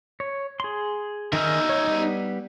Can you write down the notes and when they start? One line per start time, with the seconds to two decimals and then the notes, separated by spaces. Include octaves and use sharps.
0.20 C#5
0.60 G#4 C6
1.33 D#3 D#4 G#4 E5 F6
1.69 C#5
1.87 G3 B3